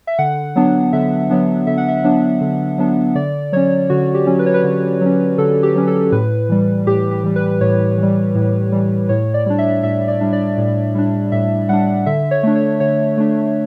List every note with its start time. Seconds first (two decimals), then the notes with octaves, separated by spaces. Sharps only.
0.07 E5
0.18 D3 F#5
0.56 F#3 B3 D4
0.93 D3 E5
1.30 F#3 B3 D4
1.67 D3 E5
1.78 F#5
1.88 E5
2.04 F#3 B3 D4
2.41 D3
2.78 F#3 B3 D4
3.15 D3 D5
3.52 F#3 C#4 C#5
3.90 D3 F#4
4.14 G4
4.27 F#3 C#4
4.39 B4
4.46 C#5
4.54 B4
4.64 D3
5.01 F#3 C#4
5.38 D3 A4
5.63 G4
5.75 F#3 C#4
5.88 A4
6.12 A2 B4
6.49 E3 G3
6.87 A2 G4
7.11 G4
7.24 E3 G3
7.36 B4
7.61 A2 C#5
7.98 E3 G3
8.35 A2
8.72 E3 G3
9.09 A2 C#5
9.34 D5
9.46 G3 D4
9.58 E5
9.83 A2 E5
10.08 D5
10.21 G3 D4
10.33 D5
10.58 A2
10.95 G3 D4
11.32 A2 E5
11.69 G3 D4 F#5
12.06 D3 E5
12.31 C#5
12.43 A3 D4
12.56 C#5
12.80 D3 C#5
13.17 A3 D4